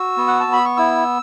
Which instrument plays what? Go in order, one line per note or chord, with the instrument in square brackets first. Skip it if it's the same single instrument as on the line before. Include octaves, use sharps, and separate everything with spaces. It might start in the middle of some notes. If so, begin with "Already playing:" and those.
Already playing: [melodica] F#4 E6
B3
F#5
A5
B3
B5
C#6
E4 E6